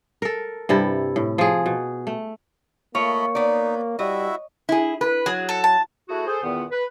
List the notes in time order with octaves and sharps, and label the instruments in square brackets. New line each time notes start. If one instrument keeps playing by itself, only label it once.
[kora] A4 A#4
G2 C3 E4 A4
A2
F3 G#4
B2
A3
[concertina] A3 D#5 B5 [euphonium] A#3 [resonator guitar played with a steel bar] F4 [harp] C#5
[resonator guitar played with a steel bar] B3 D5 [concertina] D#4
[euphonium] G3 [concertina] E4 F#4 E5 [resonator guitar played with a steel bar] D#5
[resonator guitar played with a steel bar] E4 G#4
B4
[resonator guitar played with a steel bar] F#3 [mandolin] G#4
[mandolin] A4
A5
[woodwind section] A3 E4 F#4 G#4
G#4 A4 C5
E2 A#2 D#3 B3
B4